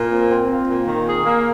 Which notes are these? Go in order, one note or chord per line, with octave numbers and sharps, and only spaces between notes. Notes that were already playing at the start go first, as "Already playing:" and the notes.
Already playing: A#2
C4
C4
F4
A#2
D#3
G#4
A#3